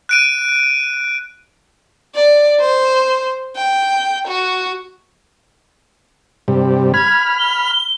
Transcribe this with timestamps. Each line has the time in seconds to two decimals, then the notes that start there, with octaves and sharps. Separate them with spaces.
0.09 F#6 D7 D#7
2.15 D5
2.60 C5
3.56 G5
4.28 F#4
6.48 G2 C3 G3
6.94 B5 F6 G#6
7.39 G7